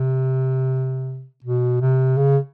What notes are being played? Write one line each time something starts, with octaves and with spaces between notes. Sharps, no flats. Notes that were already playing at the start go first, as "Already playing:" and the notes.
Already playing: C3
B2
C3
C#3